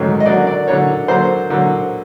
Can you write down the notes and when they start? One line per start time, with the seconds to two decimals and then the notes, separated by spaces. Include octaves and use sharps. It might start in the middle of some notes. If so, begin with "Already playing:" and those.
Already playing: G#2 D#3 F#3 A3 C#4
0.20 D#5
0.25 D3 F#3 A#3 D5
0.47 D5
0.67 D3 F#3 A#3 C#5
1.08 D3 F#3 A#3 C5
1.50 D3 F#3 A#3